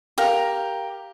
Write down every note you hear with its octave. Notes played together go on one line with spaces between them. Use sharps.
G4 A#4 F5